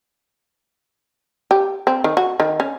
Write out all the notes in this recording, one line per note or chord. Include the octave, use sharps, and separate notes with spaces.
G4
C4
D#3
F#4
D#3
C#4